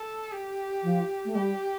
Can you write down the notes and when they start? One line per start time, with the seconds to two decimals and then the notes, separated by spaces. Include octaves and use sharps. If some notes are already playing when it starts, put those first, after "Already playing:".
Already playing: A4
0.31 G4
0.83 F3
1.25 A3
1.35 G3 G4